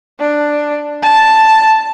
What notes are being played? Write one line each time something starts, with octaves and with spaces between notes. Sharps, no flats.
D4
A5